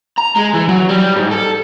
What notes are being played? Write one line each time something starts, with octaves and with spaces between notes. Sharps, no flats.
A#5
G#3
E3
F#3
G3
G#2
A4